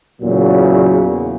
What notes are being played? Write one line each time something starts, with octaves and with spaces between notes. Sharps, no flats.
E2 A#2 C#3 F#3